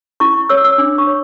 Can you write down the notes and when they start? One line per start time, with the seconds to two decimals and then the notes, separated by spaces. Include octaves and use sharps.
0.20 E4 C#6
0.49 C#5 E6
0.64 E6
0.78 D4 D6
0.98 C#6
1.07 C#5